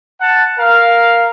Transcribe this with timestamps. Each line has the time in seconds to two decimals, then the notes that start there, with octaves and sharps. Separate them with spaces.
0.21 F#5 A5
0.58 A#4 F5